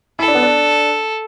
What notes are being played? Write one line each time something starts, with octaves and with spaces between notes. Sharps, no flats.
E4 A4
D4
B3
D4